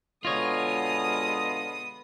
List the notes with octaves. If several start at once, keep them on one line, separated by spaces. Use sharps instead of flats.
B2 D3 G#3 B3 F4 C#5 D#5 D#6